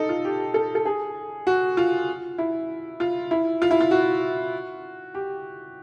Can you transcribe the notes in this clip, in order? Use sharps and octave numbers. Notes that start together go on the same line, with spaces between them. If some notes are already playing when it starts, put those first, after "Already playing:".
Already playing: D#4 A4
F4
G4
A4
A4
G#4
F#4
F4
E4
F4
E4
F4
E4
F4
F#4
G4